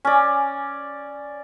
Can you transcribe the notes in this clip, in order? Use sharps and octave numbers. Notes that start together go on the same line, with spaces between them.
C#4 D5